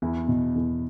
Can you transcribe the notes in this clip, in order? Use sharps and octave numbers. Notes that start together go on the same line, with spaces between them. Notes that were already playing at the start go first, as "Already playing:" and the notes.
E2 E4
B2
E2